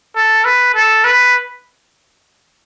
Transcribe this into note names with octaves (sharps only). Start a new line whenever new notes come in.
A4
B4
A4
B4